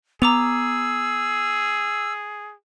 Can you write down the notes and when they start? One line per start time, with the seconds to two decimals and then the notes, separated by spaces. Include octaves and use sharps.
0.22 B3 G#4 A#5 D6 E6 F7